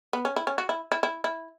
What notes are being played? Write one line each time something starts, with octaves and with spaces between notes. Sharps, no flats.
B3
C#4
E4
C#4
F#4
E4
E4
E4
E4